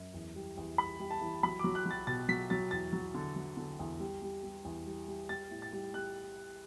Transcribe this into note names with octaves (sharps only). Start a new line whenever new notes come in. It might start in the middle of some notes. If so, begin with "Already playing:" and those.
Already playing: F#2
E2
G3
E2
G3 B5
G3
A5
E3
F#3 B5
F#3 D6
F#6
F#3 A6
B2 A6
F#3 B6
F#3 A6
E2 A6
F#3
D3
F#3
D3
E2
G3
G3
G3
E2
G3
G3
G3 A6
A2
A6
G3
G3 F#6